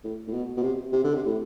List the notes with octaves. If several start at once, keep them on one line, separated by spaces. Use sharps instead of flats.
A2
A2
B2
B2
C3
C3
D3
C3
A2